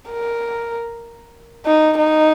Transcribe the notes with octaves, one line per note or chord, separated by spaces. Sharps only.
A#4
D#4
D#4